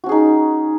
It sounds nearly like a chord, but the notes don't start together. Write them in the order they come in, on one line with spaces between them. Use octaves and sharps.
F#4 C#4 G#4 D#4